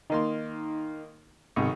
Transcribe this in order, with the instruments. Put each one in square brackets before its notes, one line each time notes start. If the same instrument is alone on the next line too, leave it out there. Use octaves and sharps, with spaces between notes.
[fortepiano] D#3 A#3 C6 [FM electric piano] D#4
[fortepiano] B1 D#3 G#3 [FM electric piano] G#2 C3 C#6